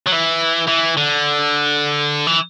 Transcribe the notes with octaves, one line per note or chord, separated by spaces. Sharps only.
F#3
E3
E3
D3
E3